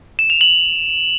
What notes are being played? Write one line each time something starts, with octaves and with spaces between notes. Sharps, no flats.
E7
F7
F#7